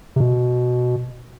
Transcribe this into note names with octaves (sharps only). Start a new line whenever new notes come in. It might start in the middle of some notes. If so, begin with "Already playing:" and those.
C3
B2